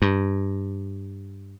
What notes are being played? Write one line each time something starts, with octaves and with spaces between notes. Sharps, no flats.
G2